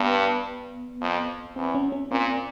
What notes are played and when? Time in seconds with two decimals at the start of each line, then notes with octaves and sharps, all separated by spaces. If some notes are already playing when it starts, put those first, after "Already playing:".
Already playing: G2 B3
1.01 F2
1.56 E2 C4
1.75 C#4
1.92 C#4
2.11 A#2 C4